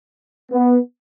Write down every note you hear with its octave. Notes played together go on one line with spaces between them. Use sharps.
B3